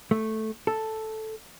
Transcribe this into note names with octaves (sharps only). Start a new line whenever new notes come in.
A3
A4